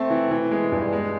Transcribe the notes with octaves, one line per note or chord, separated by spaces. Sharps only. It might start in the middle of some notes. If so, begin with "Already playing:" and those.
Already playing: A3 C4
E3
E3
G#3
G2
G#3